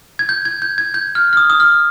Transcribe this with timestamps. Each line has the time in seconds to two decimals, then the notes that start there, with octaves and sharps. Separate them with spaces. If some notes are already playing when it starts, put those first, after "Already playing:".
0.19 G#6
0.29 G6
0.45 G#6
0.62 G6
0.78 G#6
0.94 G6
1.15 F6
1.33 F6
1.37 D#6
1.50 D#6
1.60 F6